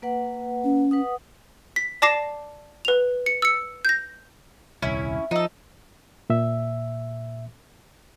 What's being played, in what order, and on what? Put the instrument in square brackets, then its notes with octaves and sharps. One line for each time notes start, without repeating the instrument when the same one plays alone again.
[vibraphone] A#3 B4 F#5
[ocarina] C#4
[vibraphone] B4 F#5 D#6
[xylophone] B6
D5 A5 D6 A#6 C7 E7
B4 F7
C#7
E6 C#7
G6 A#6
[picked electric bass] D#1 C2 [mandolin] C#4 E4
[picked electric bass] F3 [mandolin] D#4 A4
[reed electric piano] A#2 E5